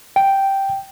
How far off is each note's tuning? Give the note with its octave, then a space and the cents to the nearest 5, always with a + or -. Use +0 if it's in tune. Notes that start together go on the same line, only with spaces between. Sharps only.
G5 -5